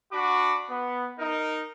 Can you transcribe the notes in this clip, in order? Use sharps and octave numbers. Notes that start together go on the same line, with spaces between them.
D4 F#4 B5 D6
B3
D#4 A#4